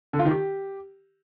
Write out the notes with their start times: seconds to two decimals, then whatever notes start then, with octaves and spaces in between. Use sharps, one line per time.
0.13 D3
0.19 F4
0.25 D#3
0.31 G4